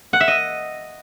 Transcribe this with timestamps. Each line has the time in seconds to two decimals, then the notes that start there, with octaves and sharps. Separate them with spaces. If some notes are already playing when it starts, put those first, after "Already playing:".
0.13 F#5
0.20 E5
0.28 D#5